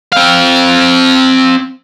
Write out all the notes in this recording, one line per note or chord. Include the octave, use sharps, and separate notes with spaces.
C4 F5